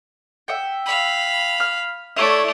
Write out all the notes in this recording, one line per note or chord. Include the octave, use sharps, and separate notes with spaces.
E5 F#5 G5
F5 B5
F6
A3 E4 C#5 D5 E5